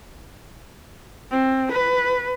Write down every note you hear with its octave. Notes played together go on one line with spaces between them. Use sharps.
C4
B4